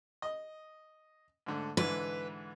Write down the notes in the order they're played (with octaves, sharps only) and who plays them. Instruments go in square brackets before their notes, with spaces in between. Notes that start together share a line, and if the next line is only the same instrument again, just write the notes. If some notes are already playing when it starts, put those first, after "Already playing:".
[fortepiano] D#5 D#6
G#2 D3 A3
[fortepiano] G#2 D3 E3 [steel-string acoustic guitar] B4